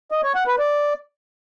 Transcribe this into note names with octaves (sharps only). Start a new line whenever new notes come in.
D#5
C#5
F#5
B4
D5